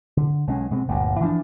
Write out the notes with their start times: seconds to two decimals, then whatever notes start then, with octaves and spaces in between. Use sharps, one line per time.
0.17 D3
0.47 B1 G#3 C#4
0.71 B2 G#3 C4
0.88 G1 D2 G2 A#2
1.20 E3 F3 B3 D4